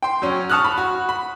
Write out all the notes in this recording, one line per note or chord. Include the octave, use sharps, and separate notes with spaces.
G5 C6
F#3 C#4
A5 C#6 D#6 F6 F#6
B5
F#4
B5